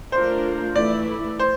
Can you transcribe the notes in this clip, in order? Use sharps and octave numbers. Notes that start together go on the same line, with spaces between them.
A3 D4 F4 A#4 C5
E3 A3 E4 D5
C5